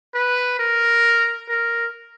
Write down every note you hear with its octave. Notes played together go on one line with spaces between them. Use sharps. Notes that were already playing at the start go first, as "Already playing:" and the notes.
B4
A#4
A#4